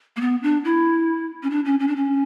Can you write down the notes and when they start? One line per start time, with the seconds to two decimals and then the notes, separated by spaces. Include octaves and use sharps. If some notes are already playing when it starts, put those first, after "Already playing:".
0.16 A#3
0.21 B3
0.43 D4
0.65 E4
1.43 C#4
1.50 D4
1.65 C#4
1.79 C#4
1.88 D4
1.96 C#4